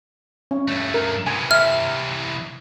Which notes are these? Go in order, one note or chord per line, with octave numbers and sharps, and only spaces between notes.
C#4
G2 A3
A#4
C3 E3 G#5
E5 F6